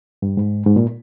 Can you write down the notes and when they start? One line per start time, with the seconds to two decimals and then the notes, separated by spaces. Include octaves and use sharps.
0.22 G2
0.37 G#2
0.67 G#2
0.76 A#2